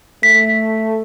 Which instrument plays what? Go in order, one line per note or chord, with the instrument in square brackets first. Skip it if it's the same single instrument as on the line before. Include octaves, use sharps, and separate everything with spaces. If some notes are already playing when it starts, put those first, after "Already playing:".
[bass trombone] A3 [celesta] B6